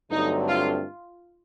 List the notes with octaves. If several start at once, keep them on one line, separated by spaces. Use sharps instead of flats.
G2 D3 F#3 A3 C4 D#4
F4